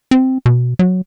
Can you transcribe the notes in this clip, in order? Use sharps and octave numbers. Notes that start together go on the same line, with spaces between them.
C4
B2
F#3